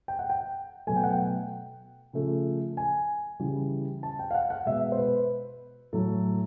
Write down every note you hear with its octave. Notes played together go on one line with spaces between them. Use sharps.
G5
F#5
G5
B2 F#3 A3 G#5
G5
F#5
G5
C#3 F3 A3
G#5
C#3 E3 G3
A5
G5
F5
F#5
F#5
B2 G#3 E5
C5
B4
A2 F#3 A3 A4